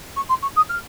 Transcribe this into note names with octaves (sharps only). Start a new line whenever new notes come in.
C#6
C6
C#6
D#6
F6